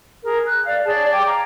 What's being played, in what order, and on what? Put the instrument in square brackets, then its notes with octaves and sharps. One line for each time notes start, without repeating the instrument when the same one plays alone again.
[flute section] G#4 A#4
F#6
D5 F5
G#4 C#5 D5 A5
G5 D6 G#6
F5 A#5